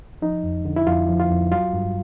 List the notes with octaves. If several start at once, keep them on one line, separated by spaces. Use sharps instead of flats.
F3 D#4
F2
D3
E4
F2 F4
F3
F4
F2
F#3 F4
G2